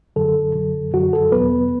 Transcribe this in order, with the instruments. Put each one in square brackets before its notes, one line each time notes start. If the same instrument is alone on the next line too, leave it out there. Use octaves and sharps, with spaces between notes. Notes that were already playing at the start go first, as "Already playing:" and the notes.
[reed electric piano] F#2 D3 F#3 A4
F#2 D3 F#3
F#2 D3 F#3 F#4
A4
E2 B2 F#3 B3 B4